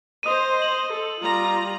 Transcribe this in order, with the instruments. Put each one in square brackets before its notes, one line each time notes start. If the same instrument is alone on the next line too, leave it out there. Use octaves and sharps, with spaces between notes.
[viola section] C5 D#5 [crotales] D#6 D#7
[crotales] F#7
[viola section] A4
G3 F4 A#5